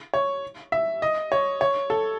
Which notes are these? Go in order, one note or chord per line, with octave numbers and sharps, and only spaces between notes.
C#5
E5
D#5
C#5
C#5
A4